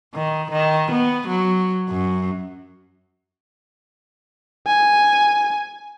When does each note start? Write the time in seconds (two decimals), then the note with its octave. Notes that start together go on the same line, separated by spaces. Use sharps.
0.14 D#3
0.51 D#3
0.91 B3
1.28 F#3
1.89 F#2
4.67 G#5